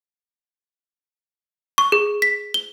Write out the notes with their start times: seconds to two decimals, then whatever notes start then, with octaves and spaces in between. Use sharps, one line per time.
1.78 C#6
1.92 G#4
2.22 B6
2.54 G7